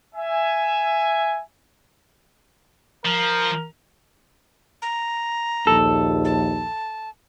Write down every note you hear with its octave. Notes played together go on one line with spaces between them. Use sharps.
E5 G#5
F3 A#4
A#5
A#1 D#2 A4
A5